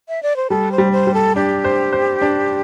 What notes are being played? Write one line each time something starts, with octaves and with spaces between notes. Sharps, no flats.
E5
D5
C5
G3 A4
C5
G3
C5
G3
A4
D4 G4
C5
C5
D4